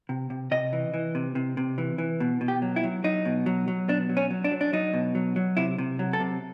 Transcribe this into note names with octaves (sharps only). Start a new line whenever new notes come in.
C3
C3
C3 D#5
E3
E3
C3
C3
C3
E3
E3
B2
B2
G4
F#3
E4
F#3
F#3 D#4
B2
F#3
F#3
B2 D4
F#3
C#4
F#3
D4
F#3
D4
F#3 D#4
B2
F#3
F#3
C3 E4
C3
F#3
A4
C3